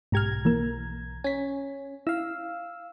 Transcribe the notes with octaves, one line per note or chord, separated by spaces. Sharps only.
B1 G#2 G4 A#5 F6 G#6
E3 A#3 A#4
C#4 G#5 B6
E4 F5 E6